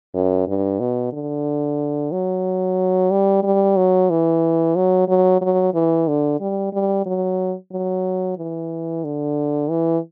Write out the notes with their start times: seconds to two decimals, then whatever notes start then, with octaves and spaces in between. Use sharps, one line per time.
0.14 F#2
0.47 G2
0.80 B2
1.13 D3
2.12 F#3
3.11 G3
3.43 G3
3.77 F#3
4.10 E3
4.75 F#3
5.08 F#3
5.41 F#3
5.74 E3
6.08 D3
6.40 G3
6.73 G3
7.06 F#3
7.72 F#3
8.37 E3
9.04 D3
9.70 E3